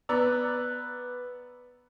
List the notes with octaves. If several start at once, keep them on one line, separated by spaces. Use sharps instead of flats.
B3 B4 D5 A#5 E6